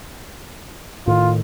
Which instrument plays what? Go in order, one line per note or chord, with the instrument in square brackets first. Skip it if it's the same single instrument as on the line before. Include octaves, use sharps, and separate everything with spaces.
[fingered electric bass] A2 D#3 [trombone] F4